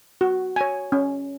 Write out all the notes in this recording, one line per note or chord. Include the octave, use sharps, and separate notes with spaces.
F#4
C#5 G#5
C#4